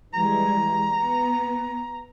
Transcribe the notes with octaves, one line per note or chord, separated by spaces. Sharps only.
E3 G3 G#3 A#5
B3